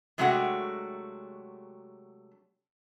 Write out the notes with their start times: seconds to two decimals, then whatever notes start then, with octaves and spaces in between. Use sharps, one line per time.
0.18 C3 F#3 G#3 A3 D4 F#4